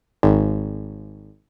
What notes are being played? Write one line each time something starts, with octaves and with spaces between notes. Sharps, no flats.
G#1